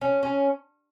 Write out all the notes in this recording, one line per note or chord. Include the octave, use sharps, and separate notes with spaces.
C#4
C#4